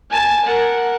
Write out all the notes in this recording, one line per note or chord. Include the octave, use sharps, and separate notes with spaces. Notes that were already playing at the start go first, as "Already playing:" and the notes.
G#5 A5
A#4 F#5